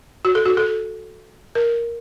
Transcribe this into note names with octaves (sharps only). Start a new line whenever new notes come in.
F#4
A4
F#4
A4
A#4